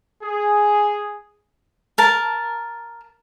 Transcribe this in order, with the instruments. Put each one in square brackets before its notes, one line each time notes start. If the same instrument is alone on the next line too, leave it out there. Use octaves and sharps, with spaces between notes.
[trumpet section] G#4
[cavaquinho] A#4 A5